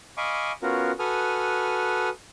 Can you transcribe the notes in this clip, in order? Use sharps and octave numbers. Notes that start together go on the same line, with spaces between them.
D#5 F5 G#5 B5 C#6 D6
B3 C#4 F4 F#4 A#4
F#4 A4 B4 G#5 D#6 F6